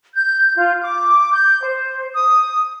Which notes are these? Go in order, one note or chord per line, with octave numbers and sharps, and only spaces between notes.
G6
F4
D6
G6
C5
D#6